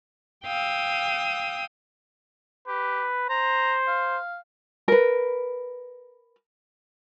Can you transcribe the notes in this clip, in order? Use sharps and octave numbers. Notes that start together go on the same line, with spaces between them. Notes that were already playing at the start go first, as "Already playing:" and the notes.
F5 G5 D#6 E6
G4 B4
C5 A#5
F5
A#4 B4